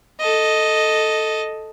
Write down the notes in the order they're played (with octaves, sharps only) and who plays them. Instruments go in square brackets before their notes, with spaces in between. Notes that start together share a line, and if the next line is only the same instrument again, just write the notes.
[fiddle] A4 D#5